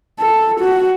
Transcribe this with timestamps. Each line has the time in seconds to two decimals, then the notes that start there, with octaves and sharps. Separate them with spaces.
0.19 A4
0.60 F#4